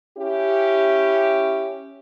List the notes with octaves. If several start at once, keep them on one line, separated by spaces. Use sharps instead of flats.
C#4 E4 G4